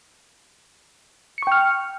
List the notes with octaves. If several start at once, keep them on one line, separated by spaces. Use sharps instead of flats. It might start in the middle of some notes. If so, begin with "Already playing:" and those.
G5 C#6 F6 C#7